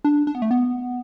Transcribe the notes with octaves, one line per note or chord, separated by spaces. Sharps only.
D4
D4
B3
A3
B3